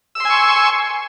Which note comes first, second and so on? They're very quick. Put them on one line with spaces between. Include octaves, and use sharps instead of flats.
E6 C6 G#5 C#6